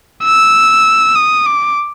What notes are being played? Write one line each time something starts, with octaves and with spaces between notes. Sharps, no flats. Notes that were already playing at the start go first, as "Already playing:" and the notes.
E6
D#6
D6